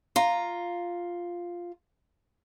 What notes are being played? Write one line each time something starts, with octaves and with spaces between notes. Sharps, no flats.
F4 A#5